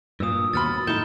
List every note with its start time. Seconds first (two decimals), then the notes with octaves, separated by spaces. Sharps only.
0.20 G2 A#2 D#6 E6
0.53 D#2 B2 B5 C6 F6 A6
0.87 A2 A3 D#4 G6 E7 G7